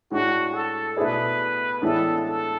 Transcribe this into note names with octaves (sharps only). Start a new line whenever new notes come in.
A2 G#3 D4 F#4
A4
B2 A3 E4 G#4 B4 D5
A2 E3 G#3 B3 D4 A4
A4